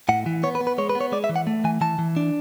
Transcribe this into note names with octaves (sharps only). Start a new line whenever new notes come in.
A2 F#5
E3
B3 C#5
B4
B3
B4
G#3 C#5
B4
B3
C#5
G#3 D5
E5
E3
F#5
A3
E3 G#5
E3 A5
E3
D4